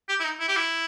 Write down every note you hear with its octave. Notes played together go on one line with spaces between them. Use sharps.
G4
E4
D#4
E4
G4
E4